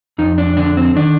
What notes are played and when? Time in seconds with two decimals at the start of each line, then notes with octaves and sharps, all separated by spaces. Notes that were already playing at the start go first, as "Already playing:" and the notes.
0.18 F2 D#4
0.38 D4
0.57 D3 D4
0.77 C4
0.95 D#3 D4